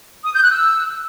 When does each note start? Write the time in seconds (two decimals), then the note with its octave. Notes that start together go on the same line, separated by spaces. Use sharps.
0.24 D#6
0.33 G6
0.42 F#6
0.52 E6